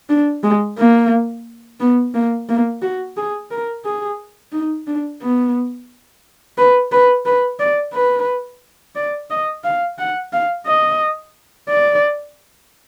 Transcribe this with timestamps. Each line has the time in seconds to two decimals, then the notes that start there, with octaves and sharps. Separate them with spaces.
0.10 D4
0.43 G#3
0.78 A#3
1.80 B3
2.14 A#3
2.49 A#3
2.82 F#4
3.17 G#4
3.51 A#4
3.85 G#4
4.53 D#4
4.87 D4
5.21 B3
6.58 B4
6.92 B4
7.26 B4
7.60 D5
7.94 B4
8.96 D5
9.30 D#5
9.64 F5
9.98 F#5
10.33 F5
10.66 D#5
11.69 D5